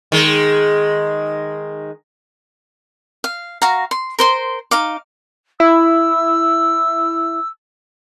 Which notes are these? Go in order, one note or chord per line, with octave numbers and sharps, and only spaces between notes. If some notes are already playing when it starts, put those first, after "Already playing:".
D#3 G#3
F5
F#4 F5 A#5
C6
A#4 C5 C6
D#4 F5 D6
E4 E6